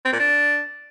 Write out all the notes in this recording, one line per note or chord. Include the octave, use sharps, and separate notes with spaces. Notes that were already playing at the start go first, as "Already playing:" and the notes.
C4
A#2
D4